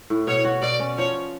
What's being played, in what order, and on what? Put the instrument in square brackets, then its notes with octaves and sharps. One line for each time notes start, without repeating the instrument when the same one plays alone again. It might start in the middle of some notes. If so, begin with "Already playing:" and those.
[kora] A2
[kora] B2 [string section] C#5
[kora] F#4
[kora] B2 [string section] D5
[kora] C#4
[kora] F3 [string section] C#5